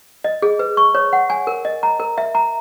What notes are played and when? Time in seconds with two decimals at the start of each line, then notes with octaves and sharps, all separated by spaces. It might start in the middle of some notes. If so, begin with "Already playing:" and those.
0.24 D#5
0.42 G#4
0.59 B4
0.77 C#6
0.95 C#5
1.13 F#5
1.30 G#5
1.47 A#4
1.65 D#5
1.83 A#5
2.00 A#4
2.18 E5
2.35 A#5